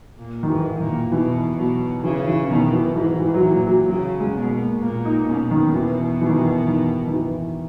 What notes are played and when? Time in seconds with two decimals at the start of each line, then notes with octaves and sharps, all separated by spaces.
0.19 A#2
0.43 D#3
0.49 G#2 E3
0.80 A#2 D#3
1.12 B2 E3
1.57 B2 F#3
2.04 C#3 E3
2.27 E3
2.50 B2 D#3
2.73 E3
2.96 G#2 E3
3.20 E3
3.34 F#3
3.43 A#2 E3
3.66 F#3
3.89 C#3 F#3
4.20 G#3
4.36 B2
4.51 A#3
4.81 A#2 A#3
5.05 D#4
5.28 B2 C#4
5.51 D#3
5.74 E3
6.21 E3
6.29 D#3
6.38 E3
6.67 D#3
7.07 D#3
7.13 E3